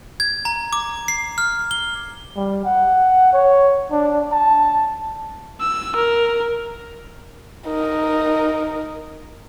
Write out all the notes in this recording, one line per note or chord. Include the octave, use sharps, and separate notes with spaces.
G#6
A#5
D6
C7
F6
G7
G3
F#5
C#5
D4
A5
E6
A#4
D#4 A#4